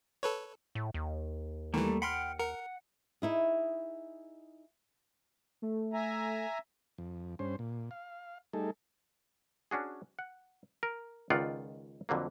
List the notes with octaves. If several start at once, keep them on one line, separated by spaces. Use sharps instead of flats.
A4 B4 C#5
A2
D#2
D#3 E3 G3 A3 A#3
F#5 G5 B5 C6 F6
A#4 F#5
D#4 E4 G#4
A3
E5 G#5 A#5
F2
G2 C#4 C5
A#2
F5
G3 A3 D#4 G#4 A4
C#4 D4 F#4 G#4
F#5
A#4
C#2 D#3 F4 D5 F#5
F2 D3 F#3 A#3